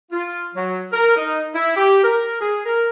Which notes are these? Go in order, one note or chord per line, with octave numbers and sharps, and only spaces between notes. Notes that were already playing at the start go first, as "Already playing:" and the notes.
F4
F#3
A#4
D#4
E4
G4
A#4
G#4
A#4